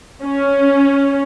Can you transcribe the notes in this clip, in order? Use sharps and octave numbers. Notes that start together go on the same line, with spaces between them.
C#4